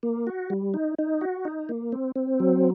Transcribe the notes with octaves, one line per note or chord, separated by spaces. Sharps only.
A#3
F#4
G3
D#4
D#4
F#4
D#4
A#3
C4
C4
F#3